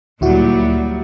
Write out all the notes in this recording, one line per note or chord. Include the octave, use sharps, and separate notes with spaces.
D2 A#2 F#3 G3 E4 F#4